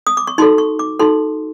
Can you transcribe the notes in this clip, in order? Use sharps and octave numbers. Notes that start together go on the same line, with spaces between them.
D#6
D6
C#6
D#4 F#4 A4 C6
C#6
D6
D#4 F#4 A4 C6